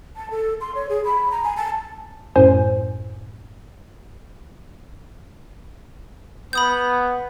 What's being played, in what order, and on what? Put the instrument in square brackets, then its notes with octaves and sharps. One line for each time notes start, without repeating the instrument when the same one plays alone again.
[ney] A5
A4
C6
C#5
G#4
B5
A#5
G#5
A5
[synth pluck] F#2 A2 C5 G#5
[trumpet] B3 [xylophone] B5 D#6 G6